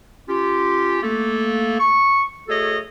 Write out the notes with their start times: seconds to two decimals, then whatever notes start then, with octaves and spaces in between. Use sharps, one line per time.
0.28 C#4 F4 G4
1.03 A3 A#3 A4
1.80 C#6
2.49 A3 F#4 G#4 A4 C#5 D#5